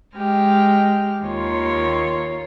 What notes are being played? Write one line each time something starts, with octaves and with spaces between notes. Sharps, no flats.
G#3 G4 F6
D#2 F4 C#5 C6